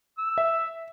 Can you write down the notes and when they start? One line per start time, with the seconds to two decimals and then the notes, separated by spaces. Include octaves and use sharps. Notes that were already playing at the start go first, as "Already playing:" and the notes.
0.18 E6
0.38 E5